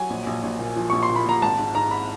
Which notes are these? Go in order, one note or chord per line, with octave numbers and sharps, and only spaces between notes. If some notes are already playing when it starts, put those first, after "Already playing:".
Already playing: F#3 G#5
A#1
A#1
A#1
A#2
F3
A#1 C#6
C6
A#2
B5
A#2 A#5
G#1 A5
G#2
G#2 A#5
B5